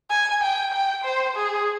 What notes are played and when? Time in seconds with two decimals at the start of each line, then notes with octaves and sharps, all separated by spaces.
0.10 G#5
0.42 G5
0.73 G5
1.04 C5
1.36 G#4